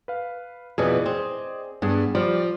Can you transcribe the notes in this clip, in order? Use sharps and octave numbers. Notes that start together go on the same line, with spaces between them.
B4 F5
F2 B2 E3 G#4 D5 D#5
C4
G2 B3 D4 G#4
F3 G3 D5